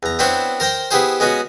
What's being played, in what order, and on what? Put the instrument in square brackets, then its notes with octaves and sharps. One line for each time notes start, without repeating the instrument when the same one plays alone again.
[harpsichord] E2 A#5
B3 C4 D4 E4 C5 C#5
A#4 C5 G5 A#5
B3 E4 G4 G#4 C5
G#3 B3 C#4 F#4